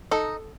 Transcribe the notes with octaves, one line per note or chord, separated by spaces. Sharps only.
D#4 A4